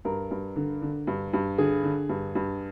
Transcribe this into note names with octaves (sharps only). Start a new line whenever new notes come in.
G2 A#4
G2
D3
D3
G2
G2
D3 G#4
D3
G2
G2